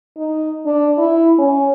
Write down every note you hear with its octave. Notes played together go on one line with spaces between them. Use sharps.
D#4
D4
E4
C#4